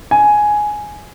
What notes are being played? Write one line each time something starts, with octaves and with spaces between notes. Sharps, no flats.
G#5